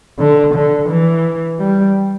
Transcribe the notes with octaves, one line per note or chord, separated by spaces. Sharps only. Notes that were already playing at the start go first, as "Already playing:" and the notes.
D3
D3
E3
G3